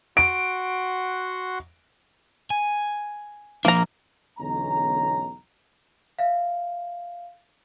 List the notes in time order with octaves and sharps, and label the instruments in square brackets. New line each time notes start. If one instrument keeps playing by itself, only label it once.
[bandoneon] F#4 F#5 C6 [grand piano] D7
[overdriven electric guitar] G#5
[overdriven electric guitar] F3 D4 [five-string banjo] A#3 A#5
[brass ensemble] B1 E2 D3 G#3 C#4 A#5
[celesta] E5 F5